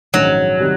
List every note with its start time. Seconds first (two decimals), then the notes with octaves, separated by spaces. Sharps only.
0.14 A#1 G#2 D#3 F#3 G#3 C#4
0.60 C3 D#3 G3